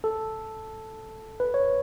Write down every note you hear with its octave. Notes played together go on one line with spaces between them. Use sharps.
A4
B4
C#5